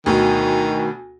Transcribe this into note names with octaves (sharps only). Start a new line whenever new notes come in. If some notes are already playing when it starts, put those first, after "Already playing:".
D2 B2 D#3